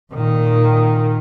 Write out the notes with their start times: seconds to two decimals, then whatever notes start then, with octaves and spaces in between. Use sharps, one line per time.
0.12 A#2 D#3